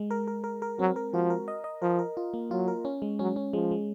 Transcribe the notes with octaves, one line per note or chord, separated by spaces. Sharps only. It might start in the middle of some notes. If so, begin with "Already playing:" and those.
Already playing: G#3
A#4
A#4
A#4
A#4
F#3 C4
A#4
F3 F#4
A#4
D#5
D#5
F3 A#4
A#4
F4
A#3
F#3 F4
A#4
C#4
G#3
F#3 C#4
C#4
F3 G#3
G#3